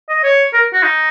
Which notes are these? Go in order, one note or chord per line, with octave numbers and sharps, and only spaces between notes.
D#5
C#5
A#4
F#4
D#4